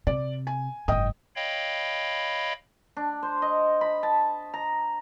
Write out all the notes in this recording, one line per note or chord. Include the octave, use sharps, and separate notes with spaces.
C3 D5
G#5
F#1 G#2 D#5 G5 D#6
C#5 D#5 F5 G5 B5
D4
C5
D#5
B5
A5
A#5